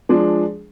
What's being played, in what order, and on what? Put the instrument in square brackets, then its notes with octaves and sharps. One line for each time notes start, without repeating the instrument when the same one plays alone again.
[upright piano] F3 G#3 D4